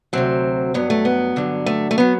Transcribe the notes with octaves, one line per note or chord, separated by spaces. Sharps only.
D2 C3 F#3 C4
G2 F#3 B3
A3
B3
G2 D3 F#3
A3
A3
F#3 B3